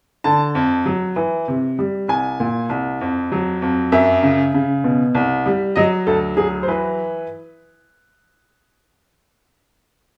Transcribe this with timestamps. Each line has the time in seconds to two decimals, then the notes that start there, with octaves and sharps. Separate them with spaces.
0.24 D3 A5
0.55 F2
0.86 F#3
1.16 E3
1.48 C3
1.79 G3
2.08 C2 G#5
2.40 A#2
2.69 C2
3.01 F2
3.32 F#3
3.62 F2
3.92 F#2 E5
4.23 C#3
4.54 C#3
4.84 B2
5.15 C2
5.46 G3
5.76 F#3 D#5
6.07 D2 A4
6.37 F#3 G#4
6.63 C5
6.68 E3 B4